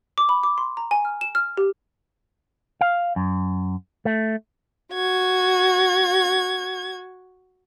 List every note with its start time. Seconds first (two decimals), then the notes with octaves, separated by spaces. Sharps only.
0.18 D6
0.29 B5
0.43 D6
0.58 C6
0.77 A#5
0.91 G#5
1.05 F6
1.21 E7
1.35 F6
1.57 G4
2.81 F5
3.16 F#2
4.05 A3
4.93 F#4 G#6